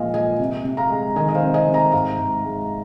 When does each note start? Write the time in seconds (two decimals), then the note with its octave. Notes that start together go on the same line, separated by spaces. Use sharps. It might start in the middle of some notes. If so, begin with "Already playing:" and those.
Already playing: A#2 F3 G#3 D#5 F5 G#5
0.14 A#2 D#5 G#5
0.39 C3
0.65 C3
0.77 F5 A#5
0.90 G#3
1.16 D#3 D#5 G#5
1.29 D#5
1.35 C5 F5
1.42 C3
1.54 D#5 G#5
1.68 C3
1.74 A#5
1.92 G#2 F5 A#5
2.18 G#2
2.44 G#3